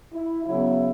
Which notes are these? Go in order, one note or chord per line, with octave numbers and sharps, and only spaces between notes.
E4
C#3 F#3 B3 E4